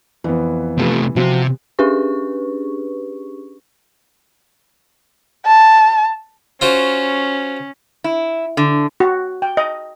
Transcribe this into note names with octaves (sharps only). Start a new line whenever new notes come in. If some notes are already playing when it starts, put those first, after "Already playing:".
F2 E3 B3
C3 F3 A3 G4 B4
C3 F3 C4 F#4 F#5
C#4 D4 G4 G#4 B4 C#6
A5
C#4 F4 F#4 C5
E4
D3
F#4
G5
D#5